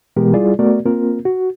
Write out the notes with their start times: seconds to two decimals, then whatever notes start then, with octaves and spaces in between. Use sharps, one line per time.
0.16 B2 E3 G#3 B3 G4 A#4
0.33 G3 E4 F4 G#4 D5
0.59 A3 B3 F#4 A#4 D5
0.85 A#3 C4 F4 A#4
1.25 F#4